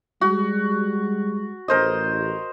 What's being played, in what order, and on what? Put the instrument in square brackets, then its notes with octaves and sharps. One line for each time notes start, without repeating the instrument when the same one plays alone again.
[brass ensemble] G3 G#3 [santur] F#4
[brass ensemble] A1 [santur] A#4 C5 D#5